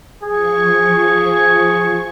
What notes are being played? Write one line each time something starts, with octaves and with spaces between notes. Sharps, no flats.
F3 G#4 C#6